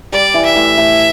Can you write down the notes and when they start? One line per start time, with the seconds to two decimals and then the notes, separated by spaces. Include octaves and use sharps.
0.12 G3 D5
0.34 E3
0.45 E5
0.56 A2
0.77 A2